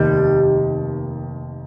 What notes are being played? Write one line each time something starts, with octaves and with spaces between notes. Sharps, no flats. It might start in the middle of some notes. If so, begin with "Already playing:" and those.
Already playing: F1 D#2 D#3 G3